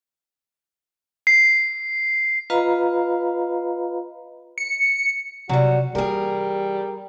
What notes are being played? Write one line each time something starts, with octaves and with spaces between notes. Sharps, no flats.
C7
F4 B4 D#5 F5 A#5 B5
C#7
C3 F#3 G3 F#4
E3 G3 A#3 G#4 A#4